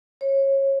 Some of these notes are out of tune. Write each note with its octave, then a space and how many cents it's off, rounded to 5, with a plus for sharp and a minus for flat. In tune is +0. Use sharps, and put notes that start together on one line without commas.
C#5 -25